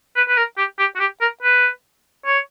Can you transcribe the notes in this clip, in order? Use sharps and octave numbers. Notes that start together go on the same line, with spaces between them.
B4
B4
A#4
G4
G4
F#4
G4
A#4
B4
C#5